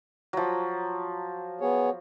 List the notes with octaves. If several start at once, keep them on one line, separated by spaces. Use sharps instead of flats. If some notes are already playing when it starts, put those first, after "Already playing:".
F3 F#3
B3 G#4 C#5